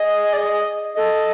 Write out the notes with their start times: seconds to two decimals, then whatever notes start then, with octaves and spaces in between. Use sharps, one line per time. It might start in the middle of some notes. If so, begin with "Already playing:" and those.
Already playing: G#4 D#5
0.33 D5
0.37 D#5
0.95 A4 D#5